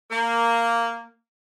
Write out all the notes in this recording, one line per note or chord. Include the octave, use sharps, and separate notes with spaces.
A#3